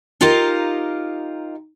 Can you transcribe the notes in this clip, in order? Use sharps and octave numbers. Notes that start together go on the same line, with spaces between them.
D#4 F4 G4 A#4 D#5 F5